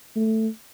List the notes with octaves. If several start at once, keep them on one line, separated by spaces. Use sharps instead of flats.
A3